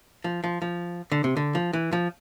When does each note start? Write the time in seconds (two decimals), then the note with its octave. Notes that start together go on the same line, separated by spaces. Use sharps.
0.24 F3
0.44 F3
0.62 F3
1.12 D3
1.24 C3
1.37 D3
1.55 F3
1.73 E3
1.93 F3